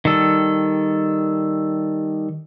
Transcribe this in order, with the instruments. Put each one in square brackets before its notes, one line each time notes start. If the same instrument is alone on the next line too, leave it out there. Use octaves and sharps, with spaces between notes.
[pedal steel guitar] D#3 G3 A4